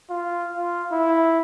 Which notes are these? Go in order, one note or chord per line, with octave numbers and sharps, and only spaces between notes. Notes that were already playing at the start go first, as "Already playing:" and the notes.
F4
F4
E4